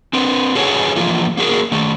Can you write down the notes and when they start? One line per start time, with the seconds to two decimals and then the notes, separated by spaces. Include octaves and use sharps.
0.13 C4 D4 B4
0.55 F#4 G#4 A4 B4 C#5 G#5
0.96 E3 F3 A3 A#3 F4
1.37 A#3 F#4 G#4 A#4
1.72 D#3 A3